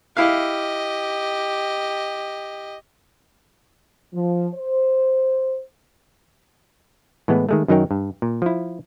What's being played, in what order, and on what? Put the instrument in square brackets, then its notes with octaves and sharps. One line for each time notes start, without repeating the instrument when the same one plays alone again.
[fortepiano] E4 F5 [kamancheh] G4 D#5
[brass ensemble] F3
C5
[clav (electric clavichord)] A2 E3 G#3 B3
D#3 G#3 A3
F#2 D#3 F#3 D#4 A#4 G5
G2
A#2
F3 E4